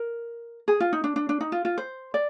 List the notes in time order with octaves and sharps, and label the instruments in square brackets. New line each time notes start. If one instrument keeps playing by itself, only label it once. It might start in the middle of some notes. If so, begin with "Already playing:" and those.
Already playing: [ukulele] A#4
G#4
F4
D#4
D4
D4
D4
D#4
F4
F4
C5
D5